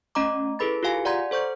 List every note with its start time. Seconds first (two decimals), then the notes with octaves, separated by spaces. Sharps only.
0.15 A3 C#4 D#5 A#5 D6
0.59 E4 G#4 A4 B4 B5 A6
0.83 F4 G4 G#4 F5 G#5
1.05 D5 F#5 A#5 C6 G#6
1.31 A4 C5 C#6 G6